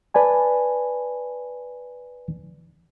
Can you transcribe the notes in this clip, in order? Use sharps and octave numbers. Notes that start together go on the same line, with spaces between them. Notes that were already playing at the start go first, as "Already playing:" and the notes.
B4 D5 G#5 A5